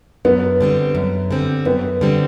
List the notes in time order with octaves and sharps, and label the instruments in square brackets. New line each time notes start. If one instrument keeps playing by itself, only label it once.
[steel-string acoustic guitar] F#2 [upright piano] B3
[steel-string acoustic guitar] D3 G3 C4
F#2
D3 G3 C4
[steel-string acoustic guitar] F#2 [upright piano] B3
[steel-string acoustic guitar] D3 G3 C4